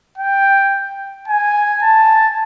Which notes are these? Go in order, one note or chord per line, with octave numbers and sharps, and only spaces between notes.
G5
G#5
A5